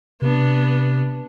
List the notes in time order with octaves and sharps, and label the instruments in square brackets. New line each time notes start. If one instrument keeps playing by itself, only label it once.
[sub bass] C3 [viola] B3 D4